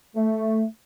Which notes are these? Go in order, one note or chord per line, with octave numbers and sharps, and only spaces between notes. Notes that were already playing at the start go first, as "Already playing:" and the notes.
A3